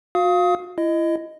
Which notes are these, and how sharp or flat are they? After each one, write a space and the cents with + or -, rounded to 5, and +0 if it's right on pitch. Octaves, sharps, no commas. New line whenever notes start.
F#4 -35 F5 +0 D#6 +25
E4 +30 D#5 +0